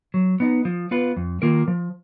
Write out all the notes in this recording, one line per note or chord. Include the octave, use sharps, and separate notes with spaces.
F#3
B3 D#4
F3
B3 F4 B4
F2
D#3 A#3 F4 A#4
F3